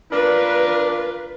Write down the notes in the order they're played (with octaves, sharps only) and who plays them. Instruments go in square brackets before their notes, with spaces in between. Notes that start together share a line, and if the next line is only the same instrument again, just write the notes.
[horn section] D4 A#4 [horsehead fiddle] F4 B4